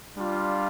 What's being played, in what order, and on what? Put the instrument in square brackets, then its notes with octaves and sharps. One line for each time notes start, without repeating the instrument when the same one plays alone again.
[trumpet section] G3 D4 F4